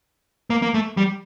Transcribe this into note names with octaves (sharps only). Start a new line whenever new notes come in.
A#3
A#3
A3
G3